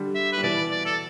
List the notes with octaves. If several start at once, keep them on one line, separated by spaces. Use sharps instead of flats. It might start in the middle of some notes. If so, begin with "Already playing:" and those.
Already playing: D3 G3
E5
B4
G3
B2 E3 D5
D5
A4